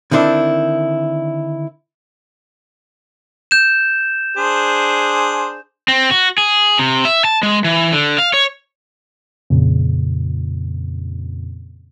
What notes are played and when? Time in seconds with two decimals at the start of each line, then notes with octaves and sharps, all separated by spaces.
0.11 D3 D#3 C4 D4 E4
3.51 G6 E7
4.37 D4 G#4 C5
5.88 C4
6.11 F#4
6.38 G#4
6.79 C3
7.05 E5
7.25 A5
7.43 G#3
7.64 E3
7.92 D3
8.18 F5
8.34 C#5
9.50 F2 A#2 C#3